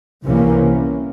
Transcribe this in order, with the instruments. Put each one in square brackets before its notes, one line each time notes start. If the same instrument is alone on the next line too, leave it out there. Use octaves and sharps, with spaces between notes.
[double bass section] C2 C3 E3 A#3 C#4